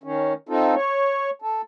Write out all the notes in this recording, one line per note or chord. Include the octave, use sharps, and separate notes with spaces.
D#3 C#4
C4 D#4 F4 A4
C#5
A4